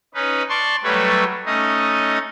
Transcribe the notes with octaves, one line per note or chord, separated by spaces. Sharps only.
C#4 D#4 B4
D5 A5 C6 C#6
F#3 G3 A3 A4 B4 C#5
A3 C#4 D#4 D#5